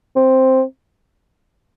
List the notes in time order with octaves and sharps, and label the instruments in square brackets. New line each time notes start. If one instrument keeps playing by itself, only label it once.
[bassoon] C4